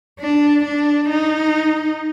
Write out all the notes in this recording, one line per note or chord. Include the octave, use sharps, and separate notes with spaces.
D4
D4
D#4